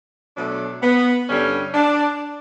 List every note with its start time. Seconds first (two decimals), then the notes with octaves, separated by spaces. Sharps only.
0.36 B2 F#3 A3 D4
0.83 B3
1.29 G2 D3 G3 C#4
1.74 D4